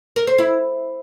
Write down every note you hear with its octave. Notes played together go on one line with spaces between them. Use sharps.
A#4
C5
E4